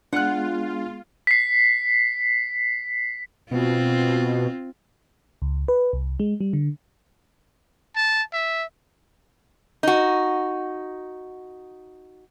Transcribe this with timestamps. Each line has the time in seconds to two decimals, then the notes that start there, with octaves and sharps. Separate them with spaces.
0.13 G#3 B3 D4 F4 G#4 F#5 F#6
1.27 B6 C7
3.51 B2 C4 F4
5.42 C#2
5.68 B4
5.93 C2
6.20 G#3
6.41 G3
6.53 D3
7.96 A5
8.33 E5
9.83 D#4 F#4